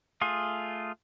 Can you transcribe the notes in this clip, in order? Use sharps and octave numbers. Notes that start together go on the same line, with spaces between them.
A3 F4 G#4